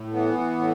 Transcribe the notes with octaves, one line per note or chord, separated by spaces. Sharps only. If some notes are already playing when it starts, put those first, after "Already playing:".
Already playing: A2
E3 B3
A2